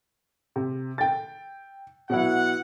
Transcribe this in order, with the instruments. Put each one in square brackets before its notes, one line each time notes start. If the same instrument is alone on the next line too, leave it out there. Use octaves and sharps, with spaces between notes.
[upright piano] C3
G5 A6
[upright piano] B2 F#3 E4 [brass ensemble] F#5